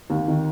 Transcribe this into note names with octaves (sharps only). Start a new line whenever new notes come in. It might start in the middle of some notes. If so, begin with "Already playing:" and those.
D#2
D#3